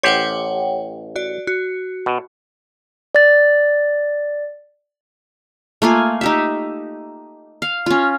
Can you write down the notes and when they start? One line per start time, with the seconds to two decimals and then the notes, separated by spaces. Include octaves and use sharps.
0.03 A1 G4 C5 C#5 F#5 G5
1.16 F#4 D5
1.47 F#4
2.06 B2
3.15 D5 A6
5.82 A3 A#3 F4 G#5
6.21 D#4 G4 E5
7.62 F5
7.86 C#4 F4